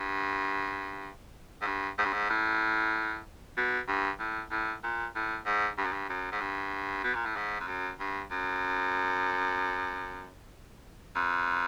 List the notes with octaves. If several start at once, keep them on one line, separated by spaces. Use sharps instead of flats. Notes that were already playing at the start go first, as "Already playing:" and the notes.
Already playing: G2
G#2
G2
G#2
G2
G#2
A2
B2
G2
A2
A2
A#2
A2
G#2
G2
F#2
G2
F#2
G#2
G2
B2
A#2
A2
G#2
F2
F#2
G2
F#2
F2